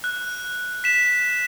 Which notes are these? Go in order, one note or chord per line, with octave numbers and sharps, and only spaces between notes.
F#6
B6 E7